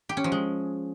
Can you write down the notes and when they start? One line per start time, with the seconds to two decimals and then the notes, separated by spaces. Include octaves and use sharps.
0.09 G4
0.17 C#4
0.24 F3
0.32 G#3